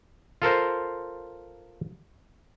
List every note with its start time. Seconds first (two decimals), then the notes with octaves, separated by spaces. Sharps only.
0.42 F4 A4 A#4 C5